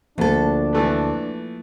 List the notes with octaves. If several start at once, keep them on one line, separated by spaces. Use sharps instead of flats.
D2 F3 A#3 D4 A4
E3 A3 B3